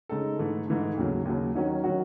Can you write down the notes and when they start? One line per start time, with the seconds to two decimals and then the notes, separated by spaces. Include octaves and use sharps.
0.09 C#3 G#3 D#4 A4
0.39 G#2 E3 A3
0.67 G#2 E3 A3
0.97 D#2 C#3 F#3
1.25 D#2 C#3 F#3
1.55 D#3 F#3 C#4 F#4
1.84 D#3 F#3 C#4 F#4